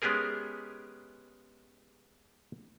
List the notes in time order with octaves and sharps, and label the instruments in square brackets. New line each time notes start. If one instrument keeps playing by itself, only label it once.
[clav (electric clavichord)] G#3 B3 C#4 G4 G#4 A#4